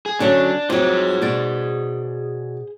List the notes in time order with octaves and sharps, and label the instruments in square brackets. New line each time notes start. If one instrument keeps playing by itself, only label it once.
[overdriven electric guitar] G#4
[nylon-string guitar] D3 F#3 C#4 [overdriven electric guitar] D4
[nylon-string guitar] F2 F#3 [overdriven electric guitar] G#4 C5
[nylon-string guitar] B2 D5